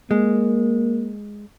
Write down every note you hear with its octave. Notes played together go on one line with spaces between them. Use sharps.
G#3 A#3